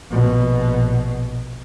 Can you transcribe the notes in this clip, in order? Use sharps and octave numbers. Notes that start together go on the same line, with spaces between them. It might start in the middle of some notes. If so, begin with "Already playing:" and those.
A#1 B2